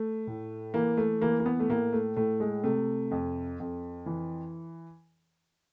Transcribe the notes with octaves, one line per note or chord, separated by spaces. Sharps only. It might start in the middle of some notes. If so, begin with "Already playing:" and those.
Already playing: A3
A2
E3 A#3
A3
E3 A#3
A#3
B3
A3
A2 A#3
A3
A2 A3
G#3
C3 A3
F2
F2
E3